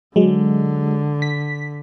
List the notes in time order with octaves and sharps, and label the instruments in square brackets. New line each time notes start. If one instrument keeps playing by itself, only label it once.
[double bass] D3 [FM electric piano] F#3 G#3
[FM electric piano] B6